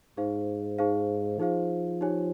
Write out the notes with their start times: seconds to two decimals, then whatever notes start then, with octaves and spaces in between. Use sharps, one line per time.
0.17 G#2 D#4 G#4 C5 F5
0.79 D#4 G#4 C5 F5
1.39 F3 D#4 G#4 C5 F5
2.01 D#4 G4 C#5 G#5